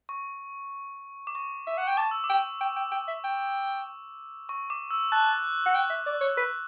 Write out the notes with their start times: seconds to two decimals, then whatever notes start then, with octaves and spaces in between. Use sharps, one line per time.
0.09 C#6
1.27 D6
1.35 C#6
1.67 E5
1.78 F#5
1.88 G5
1.97 A5 D6
2.11 E6
2.24 D6
2.30 G5
2.61 G5
2.76 G5
2.91 G5
3.08 E5
3.24 G5
4.49 C#6
4.70 D6
4.90 E6
5.12 A5 F#6
5.66 F#5
5.75 G5
5.90 E5
6.06 D5
6.21 C#5
6.37 B4